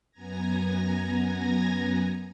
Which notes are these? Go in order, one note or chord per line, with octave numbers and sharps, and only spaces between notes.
F#2 B3 G#5 A#5 G#6 A#6